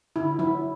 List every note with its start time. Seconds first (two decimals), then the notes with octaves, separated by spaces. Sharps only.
0.16 D3 E4
0.39 F#3 E4